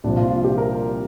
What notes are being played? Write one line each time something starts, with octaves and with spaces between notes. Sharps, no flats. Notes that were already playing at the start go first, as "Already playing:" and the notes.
C2 A#2 F3 D4
F4
F4
G4
A#4